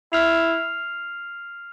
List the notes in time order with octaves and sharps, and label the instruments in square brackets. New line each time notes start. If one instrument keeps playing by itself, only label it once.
[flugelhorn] E4 [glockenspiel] F6 C7 F7